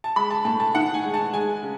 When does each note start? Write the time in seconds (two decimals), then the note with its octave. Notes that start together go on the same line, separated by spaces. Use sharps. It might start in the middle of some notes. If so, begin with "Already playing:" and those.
0.04 A5
0.16 G#3 B5
0.31 A5
0.45 A2 A5
0.60 A5
0.75 D#3 F#5
0.94 G#5
1.04 G#3
1.14 A5
1.33 G#3 G#5
1.62 C#3